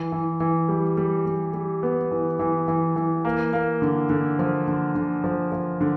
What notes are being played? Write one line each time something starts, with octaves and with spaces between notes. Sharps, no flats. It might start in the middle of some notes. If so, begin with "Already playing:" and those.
Already playing: E3
E3
E3
G3
G3
G3
G3
B3
E3
E3
E3
E3
A#3
A#3
D3
D3
F3
D3
D3
F3
F3
D3